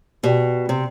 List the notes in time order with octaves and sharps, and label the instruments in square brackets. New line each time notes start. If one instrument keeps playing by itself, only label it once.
[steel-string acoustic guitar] B2 [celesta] G4 D5 G5
[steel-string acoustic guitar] C3